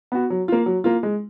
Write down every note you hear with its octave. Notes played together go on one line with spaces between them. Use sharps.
B3 F#4
F#3
A#3 F4
F#3
A#3 F4
G#3